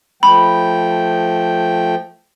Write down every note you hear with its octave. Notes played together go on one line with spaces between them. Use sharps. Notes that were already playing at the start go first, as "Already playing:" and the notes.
F3 A3 G5 B5